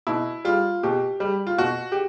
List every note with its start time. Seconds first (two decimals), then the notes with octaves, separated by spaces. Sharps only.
0.07 B2 E4
0.45 G3 F4
0.83 B2 G4
1.20 G3
1.47 F4
1.58 B2 F#4
1.92 G4